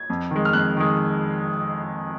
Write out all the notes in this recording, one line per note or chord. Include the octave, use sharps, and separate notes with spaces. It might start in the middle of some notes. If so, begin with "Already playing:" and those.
Already playing: G#6
F2
D#3 G#3
F6
F2 F#6
D#3 G#3